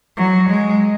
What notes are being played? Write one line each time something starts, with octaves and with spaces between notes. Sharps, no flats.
F#3
G#3